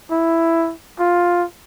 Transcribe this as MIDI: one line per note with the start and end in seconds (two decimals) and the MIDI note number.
0.11 0.73 64
1.00 1.45 65